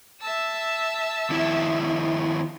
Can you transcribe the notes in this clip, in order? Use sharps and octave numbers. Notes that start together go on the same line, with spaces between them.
E5 A5 E6
D#2 E4